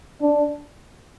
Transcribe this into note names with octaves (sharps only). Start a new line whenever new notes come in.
D4